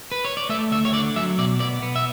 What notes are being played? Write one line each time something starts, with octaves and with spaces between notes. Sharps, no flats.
B4
C#5
D5
A3 E5
D2 E5
C#5
D3 D5
F#3 E5
B2 D5
B3 D5
B3
E5